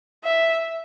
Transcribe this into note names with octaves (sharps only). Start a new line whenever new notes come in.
E5